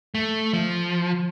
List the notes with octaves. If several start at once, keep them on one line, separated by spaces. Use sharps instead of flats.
A3
F3